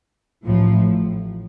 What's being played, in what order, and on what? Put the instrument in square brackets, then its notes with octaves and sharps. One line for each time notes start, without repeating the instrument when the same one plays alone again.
[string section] A1 A2 F3